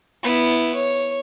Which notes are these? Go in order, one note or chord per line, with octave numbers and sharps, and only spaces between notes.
B3 E4
C#5